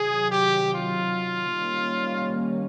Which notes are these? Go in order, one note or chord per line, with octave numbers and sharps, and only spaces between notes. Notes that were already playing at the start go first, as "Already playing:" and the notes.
Already playing: C3 D#3 F#3 G#4
G4
F4
D#3 G3 A#3 C#4